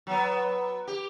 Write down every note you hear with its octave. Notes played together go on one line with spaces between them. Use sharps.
F#3 B3
G4